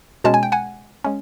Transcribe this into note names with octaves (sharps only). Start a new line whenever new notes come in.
B2 G#3 C#4 A5
G#5
G5
F#5 G#5
G#3 C#4